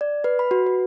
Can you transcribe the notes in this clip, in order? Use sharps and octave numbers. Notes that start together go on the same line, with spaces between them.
D5
B4
B5
F#4
B4